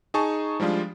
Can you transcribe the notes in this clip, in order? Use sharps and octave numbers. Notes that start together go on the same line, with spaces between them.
D#4 G#4 G#5 A5 C#6
F3 G3 G#3 D4 F4